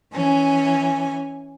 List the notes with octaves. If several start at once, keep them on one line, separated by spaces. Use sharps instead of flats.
E3 C#4 G#5